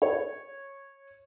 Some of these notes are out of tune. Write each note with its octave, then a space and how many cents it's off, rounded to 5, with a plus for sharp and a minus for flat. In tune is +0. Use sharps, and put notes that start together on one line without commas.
C#5 -10